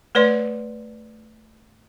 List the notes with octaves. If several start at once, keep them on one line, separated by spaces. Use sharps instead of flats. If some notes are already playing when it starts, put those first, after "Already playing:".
A3 B4 C#5 D5 C6